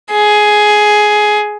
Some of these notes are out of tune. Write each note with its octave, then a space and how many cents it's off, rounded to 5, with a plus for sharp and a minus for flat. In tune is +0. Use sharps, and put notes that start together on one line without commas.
G#4 +10